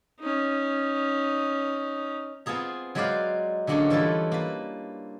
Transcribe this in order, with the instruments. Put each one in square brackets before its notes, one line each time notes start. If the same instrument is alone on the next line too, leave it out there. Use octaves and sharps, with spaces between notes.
[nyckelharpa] C#4 D#4
[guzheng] B3 C4 F4 G#4 A#5
F#3 G#3 B4 C5 D5 F5
D3 F#3 G#3 A#3 C#4 D4
E3 G3 E4 F4 A4
A#3 B4